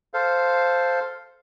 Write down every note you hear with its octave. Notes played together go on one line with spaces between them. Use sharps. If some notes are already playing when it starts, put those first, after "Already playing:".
A4 C5 F5